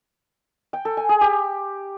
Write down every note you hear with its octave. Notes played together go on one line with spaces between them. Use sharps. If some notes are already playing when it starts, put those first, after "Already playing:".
G5
A4
G#5
G#4
G4